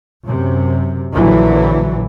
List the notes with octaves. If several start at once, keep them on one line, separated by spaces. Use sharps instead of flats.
F#2 C3
A#1 D3 E3 F#3